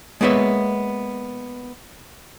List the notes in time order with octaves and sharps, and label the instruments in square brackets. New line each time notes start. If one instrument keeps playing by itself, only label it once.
[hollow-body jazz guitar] G#3 A#3 B3 C#5 E5